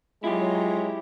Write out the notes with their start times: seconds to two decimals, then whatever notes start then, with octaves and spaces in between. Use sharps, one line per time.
0.24 F#3 G#3 E4 F4 G4 C#5 A#5